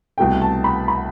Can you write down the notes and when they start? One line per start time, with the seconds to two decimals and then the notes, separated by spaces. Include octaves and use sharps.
0.18 C2 B2 A3 G5
0.41 A5
0.64 B5
0.88 B5